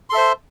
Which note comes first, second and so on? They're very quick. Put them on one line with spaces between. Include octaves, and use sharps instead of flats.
C6 A4 E5 C5